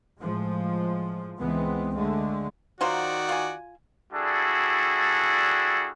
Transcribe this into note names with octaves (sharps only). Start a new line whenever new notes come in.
A2 F3 G#3
C#2 E3 G#3 B3 C4
D3 G#3 A3
D#3 F#3 F4 F#4 C5 D5
F4 G#5
G3 D4 E4 F#4 G#4 A4